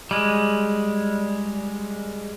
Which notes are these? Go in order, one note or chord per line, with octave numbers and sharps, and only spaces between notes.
G3 G#3